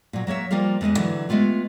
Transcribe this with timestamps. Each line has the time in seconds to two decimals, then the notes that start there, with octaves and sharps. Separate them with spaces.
0.13 A#2 F#3
0.27 F#3 A#3 C#5 E5
0.51 F3 G3 A#3 F4 A#4 F5
0.81 E2 G#3 B4 D#5
0.97 D3 E3 F#3
1.29 G#3 A3 B3 F4 G4